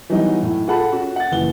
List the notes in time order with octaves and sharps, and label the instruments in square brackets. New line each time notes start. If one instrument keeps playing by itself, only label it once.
[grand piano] E3 F#3 G3 B3 D#4
A2
F4 G#4 A4 F#5 A5 B5
C#4 F#4
F#5 A6
F#1 E3 G7